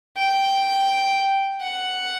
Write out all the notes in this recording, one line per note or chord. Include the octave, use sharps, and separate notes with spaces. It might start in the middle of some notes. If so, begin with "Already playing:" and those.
G5
F#5